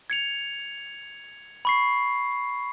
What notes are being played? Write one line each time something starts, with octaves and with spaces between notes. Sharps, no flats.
G#6 C#7 F7
B5 C#6 C7